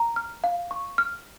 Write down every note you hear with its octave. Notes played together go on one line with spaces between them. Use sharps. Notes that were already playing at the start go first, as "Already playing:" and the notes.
Already playing: A#5
F6
F5
C#6
F6